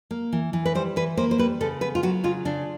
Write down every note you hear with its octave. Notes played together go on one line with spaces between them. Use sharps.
A#3
E3
E3
B4
G3 C5
E3 B4
A#3 C5
C5
G3 B4
C#3 A4
B3 B4
F4
F#3 F#4
C#3 F4
C#3 D4